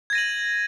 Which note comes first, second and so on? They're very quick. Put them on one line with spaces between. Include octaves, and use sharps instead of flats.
G#6 A#6 D#7 F#7